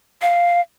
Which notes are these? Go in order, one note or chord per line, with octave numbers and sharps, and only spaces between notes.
F5